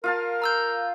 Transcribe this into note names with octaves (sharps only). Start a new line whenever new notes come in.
F4 A#4 F5 A5
A#5 E6 G6